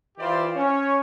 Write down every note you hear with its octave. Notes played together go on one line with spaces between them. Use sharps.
E3 E4 F4 G4 C5 D5
C#4 C#5